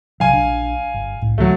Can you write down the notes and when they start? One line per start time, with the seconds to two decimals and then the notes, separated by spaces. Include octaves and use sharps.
0.20 B1 C3 F#3 F5 G#5
0.33 A#1 D4
0.94 G1
1.22 C2 A2
1.38 C#2 D3 E3 F#3 A3